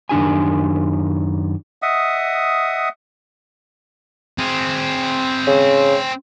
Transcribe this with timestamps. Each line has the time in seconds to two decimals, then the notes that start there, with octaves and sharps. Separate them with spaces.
0.09 F#2 D#3 D4 G4 G#5
1.82 D#5 E5 F#5 D#6
4.38 C4 G#4
5.47 C#3